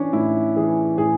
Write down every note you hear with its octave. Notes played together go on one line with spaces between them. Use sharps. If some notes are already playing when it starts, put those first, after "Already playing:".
Already playing: E3 C#4 D4
A2 E4
E3 G#4
A2 G#4